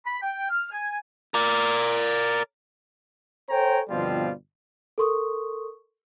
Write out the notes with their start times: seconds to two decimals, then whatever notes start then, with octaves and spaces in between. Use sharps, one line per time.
0.07 B5
0.23 G5
0.50 F6
0.72 G#5
1.34 A#4 D5
3.50 A4 C5 C#5 G5 G#5 A#5
3.89 G1 B2 F3 G3 C4 F4
4.98 A4 A#4 C6 C#6 D#6